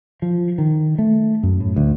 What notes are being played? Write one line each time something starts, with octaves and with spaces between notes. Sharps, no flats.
F3
D#3
A3
F#2
A2
D2